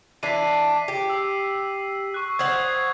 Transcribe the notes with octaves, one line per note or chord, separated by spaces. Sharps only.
E3 D4 B6 C7 D#7
G4
E6 C7
C#6 F#6
C5 F5 F#5 D#6 G#6